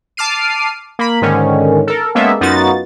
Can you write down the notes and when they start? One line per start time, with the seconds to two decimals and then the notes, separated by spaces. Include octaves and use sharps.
0.17 A5 D6 F6 C7 D#7
0.99 A#3 B5
1.22 G#2 D3 D#3 C#4
1.87 A4 A#4
2.15 G#3 A#3 B3 C#4 A4 E5
2.41 F#2 B3 D#4 F4 F#4 A6